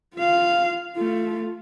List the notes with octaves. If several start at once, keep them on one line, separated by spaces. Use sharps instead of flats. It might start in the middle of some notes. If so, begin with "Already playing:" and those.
F4 F5
A3 F4